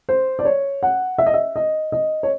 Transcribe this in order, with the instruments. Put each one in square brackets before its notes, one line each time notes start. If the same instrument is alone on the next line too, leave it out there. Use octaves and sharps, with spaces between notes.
[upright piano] C5
D5
C#5
F#5
E5
D#5
E5
D#5
D#5
C#5